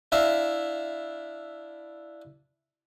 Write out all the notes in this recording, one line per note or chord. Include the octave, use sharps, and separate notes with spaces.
D4 E4 E5 F5